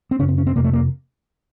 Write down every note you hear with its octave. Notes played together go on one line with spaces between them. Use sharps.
C4
F#2 C#3 C#4
C4
C#4
C4
F2 C3 A#3
A3
A#3